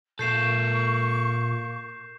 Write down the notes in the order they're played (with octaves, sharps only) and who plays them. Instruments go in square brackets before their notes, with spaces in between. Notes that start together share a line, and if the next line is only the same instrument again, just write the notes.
[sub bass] A#2 [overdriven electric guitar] A#3 A4 [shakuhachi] C#6 [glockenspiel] G6 C7 E7